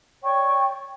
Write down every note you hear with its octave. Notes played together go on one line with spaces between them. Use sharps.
C#5 D5 G5 C#6